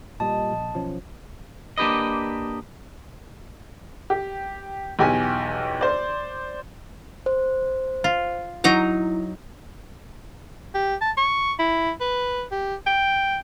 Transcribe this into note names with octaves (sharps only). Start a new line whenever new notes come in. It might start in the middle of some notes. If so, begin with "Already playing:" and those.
A#2 G3 D#5 A5
A#1
B1 F3 C#4
A#3 D4 G4 B4 D#5
G4
B1 E2 G4 G#5
C5 D5
C5
F4
F#3 D#4 E4 A#5
G4
A5
C#6
E4
B4
G4
G5